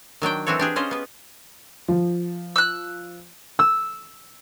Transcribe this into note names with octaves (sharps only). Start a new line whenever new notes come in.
D#3 F#3 D4 G5
E3 C4 D4 F#4 A4 C#5
D4 G4 G#4
C#4 F4 C5 D#5
B3 B4
F3
E6 F#6
E6